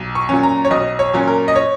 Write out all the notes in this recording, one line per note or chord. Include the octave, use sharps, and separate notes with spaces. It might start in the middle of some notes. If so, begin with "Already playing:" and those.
Already playing: B1
C#6
A#2 F#3 C#4
A#5
C#5
B1 D#5
C#5
A#2 F#3 C#4
A#4
D#5
C#5